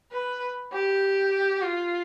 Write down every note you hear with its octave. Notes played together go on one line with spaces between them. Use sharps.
B4
G4
F4